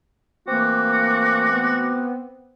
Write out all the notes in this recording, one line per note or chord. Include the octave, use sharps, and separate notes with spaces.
E3 A3 A#3 C4 F#4 D6
B3